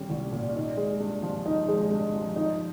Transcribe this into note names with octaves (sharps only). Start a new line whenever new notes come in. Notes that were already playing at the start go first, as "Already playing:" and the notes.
Already playing: A#2 G3 C#4
C2
A#2
D#4
G#3
G2
F3
D#4
G#3
G2
F3
D#4